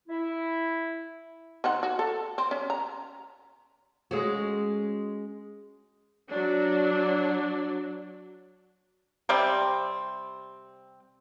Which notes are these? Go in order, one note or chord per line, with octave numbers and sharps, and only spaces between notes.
E4
D#3 C4 F#5
F#4
A4
C4
C#4
A#5
G#3 C#4 F#4
F#3 D4
C3 G3 C4